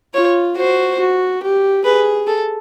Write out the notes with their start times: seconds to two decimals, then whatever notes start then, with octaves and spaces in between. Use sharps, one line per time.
0.14 F4 C#5
0.57 F#4 C5
1.00 F#4
1.42 G4
1.85 G#4 B4
2.27 A4